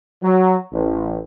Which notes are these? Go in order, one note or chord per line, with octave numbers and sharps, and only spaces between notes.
F#3
A1